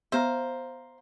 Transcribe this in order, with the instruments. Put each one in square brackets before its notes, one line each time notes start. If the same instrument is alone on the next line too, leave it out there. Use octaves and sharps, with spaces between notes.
[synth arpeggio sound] B3 E5 [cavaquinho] C5 F5 A#5